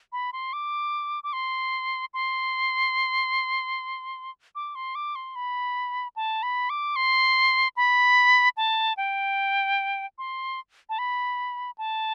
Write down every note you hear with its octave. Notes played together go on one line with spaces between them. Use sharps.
B5
C6
D6
D6
C6
C6
D6
C6
D6
C6
B5
A5
B5
D6
C6
B5
A5
G5
C6
A5
B5
A5